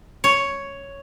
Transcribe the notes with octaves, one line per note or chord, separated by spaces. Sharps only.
C#5